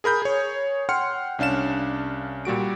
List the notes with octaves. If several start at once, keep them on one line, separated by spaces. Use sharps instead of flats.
G#4 A#4 B5 G6
G#4 C#5
F#5 G5 C6 F6 C#7
C2 C#4 D4 F5 E7
A#2 G3 F#4 D7